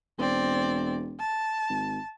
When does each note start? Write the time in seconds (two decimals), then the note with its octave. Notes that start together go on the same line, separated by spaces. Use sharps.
0.19 E1 C4 D5
1.19 A5
1.70 G#1